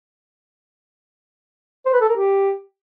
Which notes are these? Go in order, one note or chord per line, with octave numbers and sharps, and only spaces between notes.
C5
B4
A4
A#4
G4